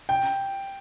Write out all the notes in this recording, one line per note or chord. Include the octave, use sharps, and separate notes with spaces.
G5